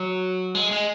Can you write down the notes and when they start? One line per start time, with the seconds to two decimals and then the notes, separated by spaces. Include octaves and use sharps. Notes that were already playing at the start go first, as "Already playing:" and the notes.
Already playing: F#3
0.55 G#3
0.71 G#3